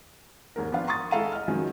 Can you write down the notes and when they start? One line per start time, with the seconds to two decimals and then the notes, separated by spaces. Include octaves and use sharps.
0.56 D#2 G#2 A#4
0.72 F3 B3 D4 F4 F5
0.87 A#5 C6 C#6 D#6 A6
1.11 G#3 E4 A4 F5 A#5 D#7
1.32 D#5 F6
1.48 D#3 F3 F#3 G#3 C#4